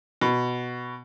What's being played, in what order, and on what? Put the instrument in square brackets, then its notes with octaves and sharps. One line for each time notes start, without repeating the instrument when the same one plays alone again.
[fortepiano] B2